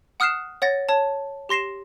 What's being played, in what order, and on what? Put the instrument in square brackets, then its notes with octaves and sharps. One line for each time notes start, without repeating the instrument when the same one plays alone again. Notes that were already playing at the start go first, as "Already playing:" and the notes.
[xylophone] F#5 D#6 F6 F#6 C7 E7
C#5 F#5 A6 A#6
C#5 A5
G4 C6 A#6 C7 E7